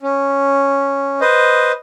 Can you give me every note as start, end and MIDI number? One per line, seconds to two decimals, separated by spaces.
0.02 1.20 61
1.21 1.72 71
1.21 1.72 72
1.21 1.72 75